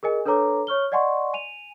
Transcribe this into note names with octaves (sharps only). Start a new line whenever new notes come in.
G#4 A#4 D#5 G#5
D4 A4 B4 C#5 A#5 D6
C#5 C#6 F6 G7
D5 D#5 F#5 G#5 C6 C#6
G#5 D#7 F7